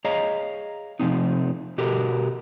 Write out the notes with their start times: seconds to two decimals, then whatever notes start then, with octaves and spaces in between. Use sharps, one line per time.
0.05 G#4 C#5 D#5 F5 A#5
0.99 C3 F3 A3 C4 D#4
1.78 B2 F#4 G4 A4 A#4